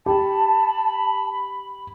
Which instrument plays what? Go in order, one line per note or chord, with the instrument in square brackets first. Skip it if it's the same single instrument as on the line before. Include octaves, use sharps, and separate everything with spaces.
[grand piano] G4 [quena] A5 [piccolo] B5